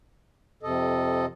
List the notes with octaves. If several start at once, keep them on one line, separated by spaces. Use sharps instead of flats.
F2 C3 A4 D#5